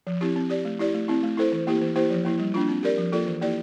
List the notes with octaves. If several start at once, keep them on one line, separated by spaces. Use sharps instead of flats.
F3
C4 E4 G4
C4
G4 D5
A3
E4 G4 D5
A3
C4 E4
A3
E4 A4 C5
E3
A#3 E4 G4
E3
A#3 E4 G4 C5
F3
A#3 E4
G3
A#3 D4 F4
C4
G4 A#4 D5
F3
A#3 F4 A4 D5
E3
A#3 E4 G4 D5